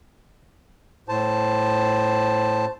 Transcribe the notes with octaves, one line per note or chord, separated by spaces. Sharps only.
A2 C5 A5